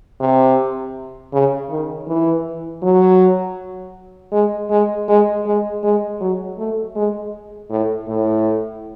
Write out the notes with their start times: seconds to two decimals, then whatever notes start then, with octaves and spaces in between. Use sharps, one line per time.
0.20 C3
1.33 C#3
1.70 D#3
2.08 E3
2.82 F#3
4.32 G#3
4.70 G#3
5.08 G#3
5.46 G#3
5.83 G#3
6.21 F#3
6.58 A3
6.96 G#3
7.70 A2
8.08 A2